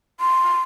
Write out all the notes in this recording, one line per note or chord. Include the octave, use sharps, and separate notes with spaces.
C6